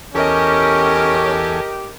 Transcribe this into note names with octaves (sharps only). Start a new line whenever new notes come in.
E2 C#4 G4 A4 A#4 D#5 G#5